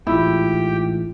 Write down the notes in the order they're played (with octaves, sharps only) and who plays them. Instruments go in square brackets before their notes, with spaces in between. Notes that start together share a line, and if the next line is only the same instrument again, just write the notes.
[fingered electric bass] A1 G#2 [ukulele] E4 [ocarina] F4 [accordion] G4 G5